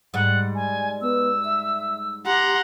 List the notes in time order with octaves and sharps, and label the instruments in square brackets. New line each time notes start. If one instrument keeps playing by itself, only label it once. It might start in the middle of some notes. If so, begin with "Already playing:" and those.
[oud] G#2 G3 [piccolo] F#5
[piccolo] G#5
[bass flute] B3 [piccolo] E6
[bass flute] E5
[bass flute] G4 [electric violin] F#5 A#5 [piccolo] C6